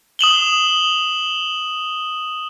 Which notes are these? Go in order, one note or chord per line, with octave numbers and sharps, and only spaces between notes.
D#6 E7 F#7 G7